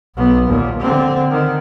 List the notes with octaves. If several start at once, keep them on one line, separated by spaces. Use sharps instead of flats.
B1 B3
D#2 A#2
D3 C4
D3 D#3